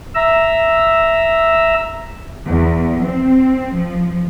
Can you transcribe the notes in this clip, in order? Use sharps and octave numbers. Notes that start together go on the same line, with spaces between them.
E5 A#5 E6
E2
C4
F3